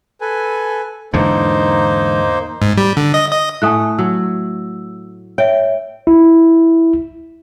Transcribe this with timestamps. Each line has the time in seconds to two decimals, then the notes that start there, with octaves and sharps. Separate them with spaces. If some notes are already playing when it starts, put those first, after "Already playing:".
0.21 A4 B4 G#5
1.14 E2 G#2 D3 A#3 D#4 C5
2.62 G#2
2.78 G3
2.97 D3
3.14 D#5
3.31 D#5
3.62 A2 A3 F#5 G#5 D#6 F#6
3.99 F#3 E6
5.38 C#5 E5 G5
6.07 E4